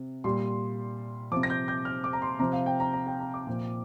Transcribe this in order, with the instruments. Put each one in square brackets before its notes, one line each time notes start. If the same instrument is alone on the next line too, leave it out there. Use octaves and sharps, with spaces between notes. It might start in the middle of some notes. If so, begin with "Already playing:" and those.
Already playing: [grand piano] C3
A#2 G3 C6
C3 F3 D6
A#6
G6
G6
F6
D6
A#5
C6
C3 F3 A#5
F5
G5
A#5
A#5
G5
A#5
D6
A#2 F3